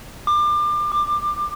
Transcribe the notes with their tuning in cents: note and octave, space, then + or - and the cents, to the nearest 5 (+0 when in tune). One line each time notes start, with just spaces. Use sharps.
D6 +30
D6 +20